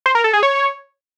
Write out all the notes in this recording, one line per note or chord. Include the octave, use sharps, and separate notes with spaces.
C5
A#4
A4
G#4
C#5